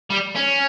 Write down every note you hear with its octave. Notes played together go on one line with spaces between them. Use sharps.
G3
C#4